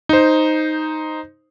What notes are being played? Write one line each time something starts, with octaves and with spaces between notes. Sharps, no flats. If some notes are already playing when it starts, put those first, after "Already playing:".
D#4 C5